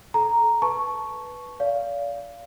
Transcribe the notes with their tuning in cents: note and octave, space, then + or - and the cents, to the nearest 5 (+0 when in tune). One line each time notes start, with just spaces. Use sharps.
A4 -25 A#5 +0
B4 +0 A5 -15 C#6 +0
D5 -35 F5 -10